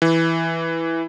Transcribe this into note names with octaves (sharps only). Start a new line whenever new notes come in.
E3